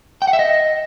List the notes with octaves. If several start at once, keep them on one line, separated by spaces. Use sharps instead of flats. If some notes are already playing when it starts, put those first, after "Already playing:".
G5
F#5
E5
D#5